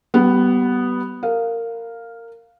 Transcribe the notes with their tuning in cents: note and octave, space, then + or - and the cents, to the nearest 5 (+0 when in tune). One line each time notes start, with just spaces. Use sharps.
G3 -30 B3 +0
A#4 -20 F5 +0